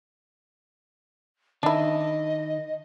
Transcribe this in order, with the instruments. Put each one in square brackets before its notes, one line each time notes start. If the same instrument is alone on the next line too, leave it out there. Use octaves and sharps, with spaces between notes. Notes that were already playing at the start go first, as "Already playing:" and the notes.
[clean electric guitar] D#3 [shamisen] D4 E4 [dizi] D#5